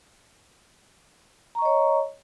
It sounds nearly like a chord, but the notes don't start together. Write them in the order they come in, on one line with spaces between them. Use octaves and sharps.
A#5 C#6 D#5 C#5